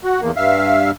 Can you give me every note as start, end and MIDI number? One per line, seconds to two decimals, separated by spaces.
0.04 0.21 66
0.21 0.31 40
0.21 0.31 58
0.36 0.91 43
0.36 0.91 76
0.36 0.91 77